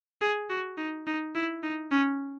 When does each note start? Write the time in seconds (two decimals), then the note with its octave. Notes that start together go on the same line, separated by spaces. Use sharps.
0.22 G#4
0.50 F#4
0.77 D#4
1.07 D#4
1.35 E4
1.63 D#4
1.91 C#4